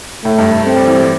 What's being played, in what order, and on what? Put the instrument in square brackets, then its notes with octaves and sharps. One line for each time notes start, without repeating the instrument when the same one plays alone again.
[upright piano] A2 [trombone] A3
[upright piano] G2
A2
[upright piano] A3 [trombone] C4
[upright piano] G3
E3
G3